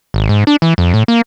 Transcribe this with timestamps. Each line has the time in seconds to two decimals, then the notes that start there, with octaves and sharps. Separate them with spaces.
0.14 G#1
0.29 G#2
0.47 D4
0.62 E3
0.78 F2
0.94 A2
1.08 A#3